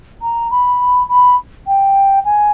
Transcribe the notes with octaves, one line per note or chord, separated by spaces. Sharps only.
A#5
B5
B5
G5
G#5